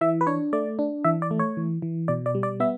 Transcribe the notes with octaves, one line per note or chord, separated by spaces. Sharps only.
E3 E5
B4
D4 C#5
A3 D5
D4
E3 E5
D5
A3
C#5
E3
E3
B2 D5
D5
G3
D5
B3 E5